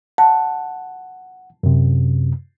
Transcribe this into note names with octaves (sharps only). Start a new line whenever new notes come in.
F#5 A5
F#2 C3